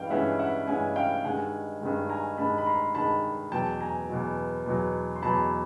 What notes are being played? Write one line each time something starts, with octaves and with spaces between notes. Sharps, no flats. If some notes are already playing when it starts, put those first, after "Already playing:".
Already playing: G2 E3 G#3 C#4 F5 G5
G2 E3 G#3 C#4 E5 F#5
E5 F#5
G2 E3 G#3 C#4 F#5 G#5
F5 G5
G2 D#3 G#3 F#5 G#5
G2 D#3 G#3
G#5 A#5
G2 D#3 G#3 A5 B5
B5
A#5 C6
G2 D#3 G#3 A5 B5
E2 B2 F#3 G5 A5
G#5 A#5
E2 B2 F#3
E2 B2 F#3
C6
E2 B2 F#3 A5 B5